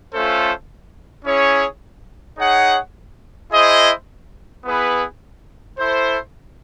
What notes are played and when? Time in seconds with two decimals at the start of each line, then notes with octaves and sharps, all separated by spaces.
0.13 A3 C#4 F4 A4 C5
1.25 C#4 E4 G#4 C#5
2.38 D#4 G#4 C#5 F#5
3.52 E4 G#4 C5 D#5
4.65 B3 E4 G#4 B4
5.78 E4 A4 C5